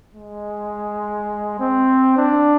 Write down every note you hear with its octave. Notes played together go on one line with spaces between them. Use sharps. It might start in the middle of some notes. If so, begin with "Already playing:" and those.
G#3
C4
D4